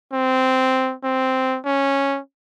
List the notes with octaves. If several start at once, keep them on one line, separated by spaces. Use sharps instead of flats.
C4
C4
C#4